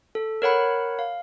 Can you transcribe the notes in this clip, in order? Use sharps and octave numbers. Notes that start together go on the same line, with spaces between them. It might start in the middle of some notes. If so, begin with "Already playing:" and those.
A4
A#4 C#5 F#5 B5
F5